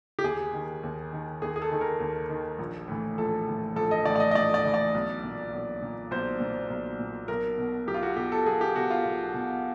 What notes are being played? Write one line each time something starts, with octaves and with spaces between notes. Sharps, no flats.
G4
D#2 G#4
D#3
D#2
D#3
D#2 G#4
G#4
A4
D#3
A#4
D#2
D#3
A#1
A2 E3
A#1 A4
A2 E3
A#1 A4
D#5
A2 E3 D5
D5
D#5
D#5
A#1 D5
D5
A2 E3
D5
B1
A#2
B1
A#2
B1 C5
A#2
B1
A#2
B1 A#4
B2
B1 G4
F4
F#4
B2 G4
A4
B1 G#4
G4
B2 F#4
F4
B1
B2